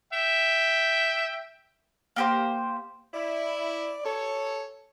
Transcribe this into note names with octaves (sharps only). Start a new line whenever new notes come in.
E5 G5
A#3 G4 C5
E4 D5
A4 C#5